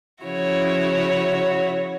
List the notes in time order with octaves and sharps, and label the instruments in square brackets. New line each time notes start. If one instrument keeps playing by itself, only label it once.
[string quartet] C#3 F3 E4 F#4 C#5